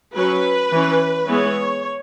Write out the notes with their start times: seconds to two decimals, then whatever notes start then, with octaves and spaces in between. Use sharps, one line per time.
0.16 F#3 C#4 B4
0.72 E3 C#4
1.27 E3 G#3 B3 C#5